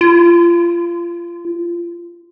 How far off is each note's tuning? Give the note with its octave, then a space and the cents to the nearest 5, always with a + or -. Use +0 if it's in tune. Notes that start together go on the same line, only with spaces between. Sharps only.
F4 -25